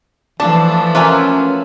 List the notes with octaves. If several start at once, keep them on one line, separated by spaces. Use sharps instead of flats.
E3 F3 A3 D4 A5
F#3 A#3 C#4 F4 B4 E5 G#5